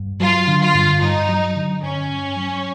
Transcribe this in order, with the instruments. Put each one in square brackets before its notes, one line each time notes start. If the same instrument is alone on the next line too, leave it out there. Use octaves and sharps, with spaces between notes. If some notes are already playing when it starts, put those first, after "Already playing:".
Already playing: [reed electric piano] G2
[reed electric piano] F#3 [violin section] F4
[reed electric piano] D3
[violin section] F4
[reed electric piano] G2
[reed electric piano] G2 [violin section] D#4
[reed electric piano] F#3
D3
[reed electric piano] G2 [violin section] C#4
[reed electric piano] G2
F#3